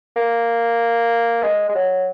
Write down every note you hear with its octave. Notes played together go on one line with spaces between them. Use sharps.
A#3
G#3
G#3
F#3